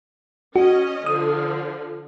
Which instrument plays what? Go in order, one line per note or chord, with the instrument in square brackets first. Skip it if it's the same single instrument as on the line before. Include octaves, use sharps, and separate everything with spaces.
[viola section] C#4 D#5 [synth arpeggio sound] F#4
[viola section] D3 F3 [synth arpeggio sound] D#6